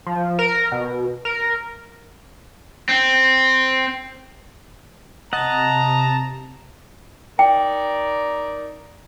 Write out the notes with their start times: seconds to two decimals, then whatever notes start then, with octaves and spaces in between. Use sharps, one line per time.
0.07 F3
0.39 A#4
0.72 B2
1.25 A#4
2.89 C4
5.33 C3 D#5 F#5 A5 A#5
7.39 D#4 A#4 D5 G5